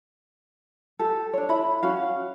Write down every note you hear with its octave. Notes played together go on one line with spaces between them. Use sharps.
G4 A4
D4 C#5
E4 B5
C#4 F#4 F5